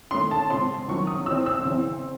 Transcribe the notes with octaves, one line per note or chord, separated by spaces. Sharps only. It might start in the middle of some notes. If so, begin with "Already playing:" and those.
D#3 A3 C#4 C6
A5
C#3 G#3 C4 C6
D#3 F#3 C#4 C#6
D#6
E3 C4 E6
E6
C#3 E3 C4